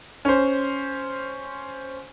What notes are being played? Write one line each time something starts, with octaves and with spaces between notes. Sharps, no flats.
C#4 C5